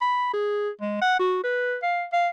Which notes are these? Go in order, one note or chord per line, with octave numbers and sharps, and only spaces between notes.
B5
G#4
G#3
F#5
F#4
B4
F5
F5